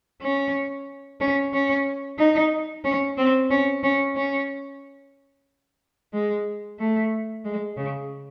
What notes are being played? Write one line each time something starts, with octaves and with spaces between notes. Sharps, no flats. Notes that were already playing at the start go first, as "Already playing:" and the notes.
C#4
C#4
C#4
D#4
C#4
C4
C#4
C#4
C#4
G#3
A3
G#3
C#3